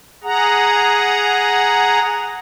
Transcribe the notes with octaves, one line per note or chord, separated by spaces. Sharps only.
G#4 F#5 A#5